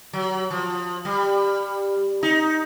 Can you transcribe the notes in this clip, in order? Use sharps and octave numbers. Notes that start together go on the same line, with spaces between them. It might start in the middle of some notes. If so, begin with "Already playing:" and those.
F#3
F3
G3
D#4